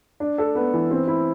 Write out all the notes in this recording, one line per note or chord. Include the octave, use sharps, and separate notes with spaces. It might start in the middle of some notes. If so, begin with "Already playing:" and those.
D4
A4
B3
E3
C4
E4